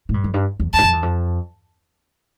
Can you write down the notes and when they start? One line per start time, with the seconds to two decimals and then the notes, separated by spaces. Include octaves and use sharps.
0.09 A2
0.14 G2
0.24 F2
0.34 G2
0.60 E2
0.73 E2 G2 A5
0.83 F2
0.93 E2
1.03 F2